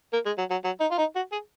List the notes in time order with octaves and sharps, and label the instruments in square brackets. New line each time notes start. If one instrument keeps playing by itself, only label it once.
[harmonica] A#3
G#3
F#3
F#3
F#3
D#4
F4
D#4
F#4
G#4